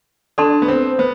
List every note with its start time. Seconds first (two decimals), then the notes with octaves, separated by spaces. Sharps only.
0.38 D4 A4 D5 A5 C6
0.62 B3
0.68 C4
0.99 B3 C5